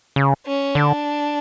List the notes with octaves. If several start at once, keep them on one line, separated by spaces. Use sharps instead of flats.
C#3
C#4
D3 D4